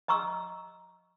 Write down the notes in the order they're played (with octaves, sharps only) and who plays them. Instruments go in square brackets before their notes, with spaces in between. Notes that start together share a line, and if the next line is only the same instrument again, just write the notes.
[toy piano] D#5 A#5 C#6 E6